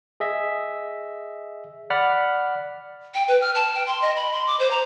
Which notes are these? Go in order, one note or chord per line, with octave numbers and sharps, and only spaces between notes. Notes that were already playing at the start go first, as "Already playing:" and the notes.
G#4 D#5 E5
D5 F#5 B5 F6
G5
B4
F6
A5
G5
C6
D#5
B5
C6
D6
C5
A#5